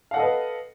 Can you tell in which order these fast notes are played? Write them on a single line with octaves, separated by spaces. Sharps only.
F5 F#5 A4 D#5 B4